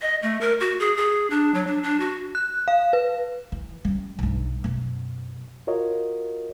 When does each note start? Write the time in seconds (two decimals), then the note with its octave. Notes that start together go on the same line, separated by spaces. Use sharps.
0.02 D#5
0.22 A3
0.41 A#4
0.60 F#4
0.80 G#4
0.97 G#4
1.30 D4
1.54 F#3
1.67 D4
1.83 D4
2.00 F#4
2.35 F#6
2.68 F5
2.93 B4
3.52 E3
3.85 G3 C#4
4.19 B1 G2
4.64 F#2 B2
5.67 F4 F#4 A#4 C#5 D#5